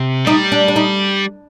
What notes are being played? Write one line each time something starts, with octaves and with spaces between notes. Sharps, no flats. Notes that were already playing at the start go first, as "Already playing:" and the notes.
Already playing: C3
G3 D#4
D4
D4
D#4